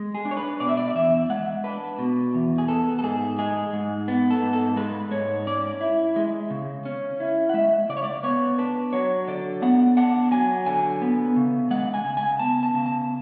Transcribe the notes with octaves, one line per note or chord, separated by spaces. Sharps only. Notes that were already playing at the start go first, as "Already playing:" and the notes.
Already playing: G#3
G#4
D4
C#5
B4
B2 D5
E5
D5
E2 E5
G#3 F#5
D4 B4
B2
E2
G#4
B3 A4
A4
G#2 G#4
G#3 G#4
G#2
B3
A4
G#2
A4
G#3 B4
G#2 C#5
C#4 D5
E4
G#3
C#3
C#4
E4
F#5
G#3 E5
C#3 D5
C#5
D5
B3 C#5
D4 B4
F#3 C#5
D3 D5
B3 F#5
D4 F#5
F#3 G#5
D3 G#5
B3
C#3
G#3 F#5
G#5
C#3
G#5
B3 A5
A5
C#3
A5